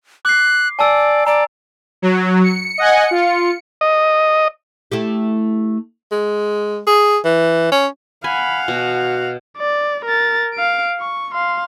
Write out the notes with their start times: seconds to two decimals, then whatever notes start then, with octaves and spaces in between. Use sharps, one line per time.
0.25 D6 F#6 C7
0.79 D5 G#5 A5 E6
1.27 D5 A#5
2.02 F#3
2.44 C#7
2.78 D#5 F#5 G#5
3.11 F4
3.81 D#5
4.92 A3 E4 G4
6.11 G#3
6.87 G#4
7.25 E3
7.72 C#4
8.24 F5 F#5 G#5 B5
8.68 B2 F#4
9.58 D5
10.05 A#4 A6
10.54 F5 D7
10.99 C#6
11.34 F5 C6